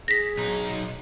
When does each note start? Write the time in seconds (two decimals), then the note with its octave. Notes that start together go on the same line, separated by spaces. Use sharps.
0.08 G#4 A#6 B6
0.38 B1 D#4